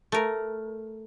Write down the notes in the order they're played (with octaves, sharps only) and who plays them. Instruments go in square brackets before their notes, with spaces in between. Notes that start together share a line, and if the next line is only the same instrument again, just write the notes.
[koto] A3 A#4